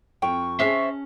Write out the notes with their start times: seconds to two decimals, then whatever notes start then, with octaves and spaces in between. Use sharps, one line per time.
0.22 F2 G5 C#6
0.59 C#4 G#4 C5 E5 A5